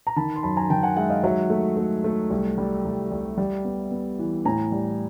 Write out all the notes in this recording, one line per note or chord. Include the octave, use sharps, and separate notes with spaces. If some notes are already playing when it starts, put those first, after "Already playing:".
A#5
D#3 A5 B5
C6
F#2 A5 B5
G#5 A#5
D#3 G5 A5
F#5 G#5
G#3 E5 F#5
D#5 F5
F#3 E5 F#5
A3
A3
A3
C2
G3
C2
C2
G3
B3
B3
E3
A2 G#5 A#5
G3